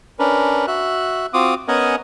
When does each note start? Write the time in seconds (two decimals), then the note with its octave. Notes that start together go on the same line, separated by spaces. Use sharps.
0.19 C#4 D4 A#4 B4
0.68 F#4 E5 F#6
1.34 C4 F4 F#4 D6 D#6
1.68 B3 C#4 A#4 D#5 F#5 G#5